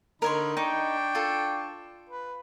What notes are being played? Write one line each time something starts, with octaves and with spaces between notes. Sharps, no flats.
D3 D#4 A#4 C#5 B5 C6
D4 D#4 G5 C#6
F4 A4
B4